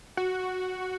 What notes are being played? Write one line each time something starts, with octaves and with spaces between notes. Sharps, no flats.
F#4